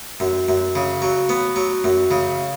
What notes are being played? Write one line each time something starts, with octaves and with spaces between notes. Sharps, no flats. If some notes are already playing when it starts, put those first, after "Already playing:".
F#2
F#2
C#3
F#3
B3
F#3
F#2
C#3